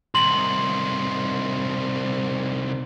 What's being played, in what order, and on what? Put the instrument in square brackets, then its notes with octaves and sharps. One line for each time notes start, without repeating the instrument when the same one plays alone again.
[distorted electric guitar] C2 D#3 [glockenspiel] C6 F#7